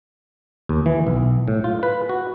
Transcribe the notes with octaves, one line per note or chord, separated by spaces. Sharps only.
D#2
E3
B1
A2
F4
B4
F#4